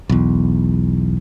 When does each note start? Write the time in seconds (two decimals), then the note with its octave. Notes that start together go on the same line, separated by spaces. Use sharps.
0.09 B1 E2